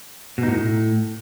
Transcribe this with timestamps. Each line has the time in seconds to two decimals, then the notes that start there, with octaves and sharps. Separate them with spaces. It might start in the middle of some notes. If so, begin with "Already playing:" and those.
0.38 B2
0.43 D#4
0.48 A2